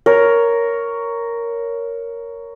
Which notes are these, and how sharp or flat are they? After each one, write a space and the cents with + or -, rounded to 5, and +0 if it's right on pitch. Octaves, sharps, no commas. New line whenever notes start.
A#4 +0 C#5 +10